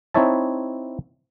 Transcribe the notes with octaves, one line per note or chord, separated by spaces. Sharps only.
C4 D#4 E4 C#5 E5 A5